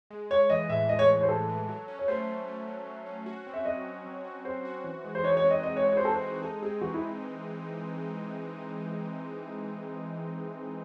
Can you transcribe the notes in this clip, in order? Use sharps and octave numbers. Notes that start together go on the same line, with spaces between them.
G#3
G#3 C#5
E3 D#5
A2 E5
G#3 D#5
C#5
G#3
C#5
C5
A2 A4
E3
F#3
C#4
C#5
A3 C5
A3
A3
F#3
F#3
C#4
F#4
C4
E5
F#3 D#5
F#3
F#3
F#4
C4 C5
F#4
E3
G#3
C5
D#4 C#5
C#5
C4
D#5
G#3 D#5
C#5
G#3
C#5
C5
C4 A4
C5
G#3
D#4 A4
C4 G#4
E3 F#4
E4